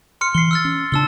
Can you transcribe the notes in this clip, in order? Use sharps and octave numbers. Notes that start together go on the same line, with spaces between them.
C6 F6 C#7
E3 C7 C#7 G7
E6 F6 A6
C#4
C#3 C#4 D4 A5 E6 G7